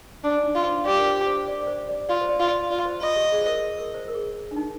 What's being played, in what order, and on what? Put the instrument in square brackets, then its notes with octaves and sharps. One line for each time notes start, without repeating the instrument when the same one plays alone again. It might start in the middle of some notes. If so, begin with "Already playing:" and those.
[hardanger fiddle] D4
[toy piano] D4
D#4
[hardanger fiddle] F4
[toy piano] C5
[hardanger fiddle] G4 [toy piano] D5
[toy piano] A#4
C5
C5
C5
D5
D5
C5
D5
[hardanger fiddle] F4 [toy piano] D5
[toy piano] C5
D5
[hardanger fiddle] F4
[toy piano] D5
[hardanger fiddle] F4 [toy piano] D5
[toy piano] C5
[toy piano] F4 [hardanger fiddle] D#5
[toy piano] G4
G#4
C5
A#4
A#4
C5
A#4
G#4
D4
D#4